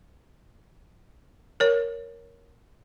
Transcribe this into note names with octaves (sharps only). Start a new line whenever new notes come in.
A#4 C#5